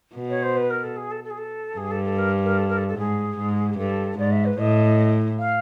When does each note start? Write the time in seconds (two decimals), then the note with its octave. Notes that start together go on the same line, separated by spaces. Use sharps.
0.16 B2
0.29 C#5
0.42 C5
0.56 B4
0.70 A#4
0.83 A4
0.96 G#4
1.10 A4
1.23 A4
1.30 G#4
1.37 A4
1.77 G2 G#4
1.90 A4
2.04 A4
2.18 A#4
2.44 A#4
2.57 A4
2.68 A#4
2.77 A4
2.87 A4
2.97 G#2 G#4
3.37 G#2
3.77 G2 A4
4.18 G#2 D5
4.31 E5
4.45 B4
4.58 A2 D#5
5.38 F5